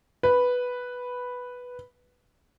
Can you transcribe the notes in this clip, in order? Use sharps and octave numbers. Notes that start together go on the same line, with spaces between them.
B4